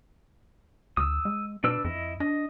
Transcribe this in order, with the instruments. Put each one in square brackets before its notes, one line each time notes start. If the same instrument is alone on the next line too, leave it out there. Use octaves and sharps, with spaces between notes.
[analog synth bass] D2 [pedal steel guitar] D#6 E6
[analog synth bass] G#3
[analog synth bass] B2 [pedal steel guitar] D4 B4 E6
[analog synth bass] F2 [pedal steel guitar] E4 D#5
[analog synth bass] D4 [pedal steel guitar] D#5